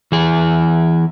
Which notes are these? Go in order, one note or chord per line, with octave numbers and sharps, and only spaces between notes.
E3 G#4